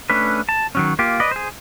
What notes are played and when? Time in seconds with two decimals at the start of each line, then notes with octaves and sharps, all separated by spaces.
0.10 A3 C#4 D4 B4
0.49 A5
0.75 D#3 F#3 C#4
0.99 A#3 F4 G4
1.20 B4 D5 D#5
1.31 G#4 C5